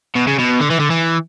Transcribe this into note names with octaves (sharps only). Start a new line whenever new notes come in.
B2
C#3
B2
D3
E3
D3
E3